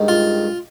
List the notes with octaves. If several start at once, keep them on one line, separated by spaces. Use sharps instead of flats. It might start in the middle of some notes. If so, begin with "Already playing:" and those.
Already playing: G2 D#3 G#3
F4